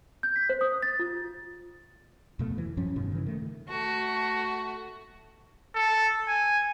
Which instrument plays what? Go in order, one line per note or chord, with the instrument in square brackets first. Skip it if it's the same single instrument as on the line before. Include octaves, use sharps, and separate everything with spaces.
[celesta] G6
B6
C5
D#6
A6
F4
[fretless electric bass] F2 B2 A3
E3
F#2 F3 C#4
G2 B2 D#3
C#3 E3
D#3 A3
[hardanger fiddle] A3 F#4
[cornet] A4
G#5